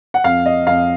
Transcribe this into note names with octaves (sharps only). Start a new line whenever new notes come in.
F#5
F2 F5
D#5
F2 F5